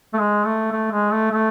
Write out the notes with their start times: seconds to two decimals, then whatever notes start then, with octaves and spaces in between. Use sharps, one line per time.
0.13 A3
0.19 G#3
0.46 A3
0.72 A3
0.91 G#3
1.12 A3
1.32 A3